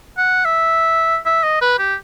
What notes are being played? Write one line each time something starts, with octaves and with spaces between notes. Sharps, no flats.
F#5
E5
E5
D#5
B4
G4